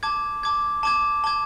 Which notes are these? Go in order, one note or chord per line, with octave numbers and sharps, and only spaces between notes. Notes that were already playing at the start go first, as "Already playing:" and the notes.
A5 D6 G#6
A5 D6 G#6
A5 D6 G#6
A5 D6 G#6